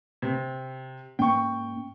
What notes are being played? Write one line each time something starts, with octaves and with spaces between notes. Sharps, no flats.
C3
G#2 A#3 C#4 G5 C#6